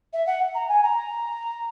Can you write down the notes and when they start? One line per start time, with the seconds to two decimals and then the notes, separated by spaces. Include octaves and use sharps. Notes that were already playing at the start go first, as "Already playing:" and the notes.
0.13 E5
0.26 F#5
0.54 A#5
0.68 G#5
0.83 A#5